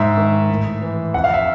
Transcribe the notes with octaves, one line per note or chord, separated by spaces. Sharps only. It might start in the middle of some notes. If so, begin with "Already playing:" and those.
Already playing: G#2 E5
D#3
A2
E3
F2 F#5
F5
E5